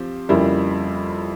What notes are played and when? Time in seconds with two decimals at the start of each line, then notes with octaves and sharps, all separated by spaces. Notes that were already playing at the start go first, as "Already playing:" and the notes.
Already playing: F3 C4 G4
0.29 F2 C#3 G3 A#3 E4